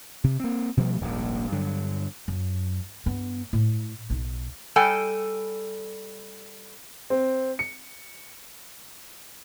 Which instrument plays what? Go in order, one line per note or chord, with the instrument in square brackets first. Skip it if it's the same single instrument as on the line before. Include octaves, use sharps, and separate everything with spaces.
[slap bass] C3
A#3 C4
B2 F3 G3 A3
D#1 A#1 D#2 G#2
G2 D3 F#3
[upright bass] F#2
G2 B3
A2
B1 D#4
[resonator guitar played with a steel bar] G3 A4 G5 G#5
[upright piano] C4
C#7